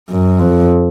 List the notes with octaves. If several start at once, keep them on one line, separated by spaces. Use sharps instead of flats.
F#2
F2